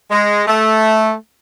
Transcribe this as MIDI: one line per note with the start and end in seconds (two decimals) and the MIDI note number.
0.11 0.43 56
0.47 1.12 57